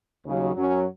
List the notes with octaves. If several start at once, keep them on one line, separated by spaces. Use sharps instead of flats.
D#2 C#3 F#3
F#2 F#3 C#4